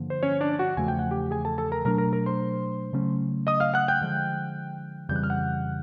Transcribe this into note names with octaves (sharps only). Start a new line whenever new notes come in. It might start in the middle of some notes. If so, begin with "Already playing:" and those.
Already playing: G2 D3 F3 A#3
C5
C#4 C#5
D4 D5
F#4 F#5
E2 C#3 F3 A3 G#5
G5
F#5
G4 G5
G#4 G#5
A4 A5
A4 A5
A#4 A#5
B2 F#3 A3 D4 A#4 A#5
A#4 A#5
A#4 A#5
C5 C6
C#3 F#3 A3 C#4
D#5 D#6
F5 F6
F#5 F#6
G5 G6
D3 F3 G#3
F2 C#3 E3 G3 G6
F#6
F6
F#5 F#6